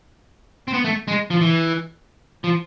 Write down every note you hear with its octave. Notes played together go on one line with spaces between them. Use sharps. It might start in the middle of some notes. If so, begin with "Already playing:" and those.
C4
B3
A3
G#3
F3
E3
F3